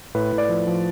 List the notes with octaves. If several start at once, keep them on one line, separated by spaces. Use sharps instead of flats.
A2 B4
A2
D5
F3
F3